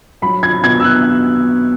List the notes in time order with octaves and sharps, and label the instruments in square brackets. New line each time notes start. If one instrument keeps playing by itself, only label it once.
[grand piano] F#3 [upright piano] B5
[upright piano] G#6
[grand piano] B2 [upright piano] G#6
[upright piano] E6
F#6